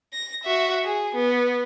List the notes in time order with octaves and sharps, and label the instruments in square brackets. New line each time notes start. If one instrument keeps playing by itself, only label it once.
[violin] A#6
F#4 E5
G#4
B3